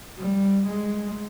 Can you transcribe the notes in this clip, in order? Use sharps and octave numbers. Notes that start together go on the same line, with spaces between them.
G3
G#3